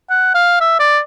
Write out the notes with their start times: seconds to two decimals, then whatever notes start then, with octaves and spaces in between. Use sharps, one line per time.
0.10 F#5
0.35 F5
0.61 E5
0.79 D5